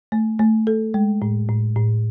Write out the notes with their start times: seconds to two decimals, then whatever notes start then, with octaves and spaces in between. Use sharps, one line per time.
0.12 A3
0.39 A3
0.67 A4
0.94 G#3
1.22 A2
1.49 A2
1.76 A2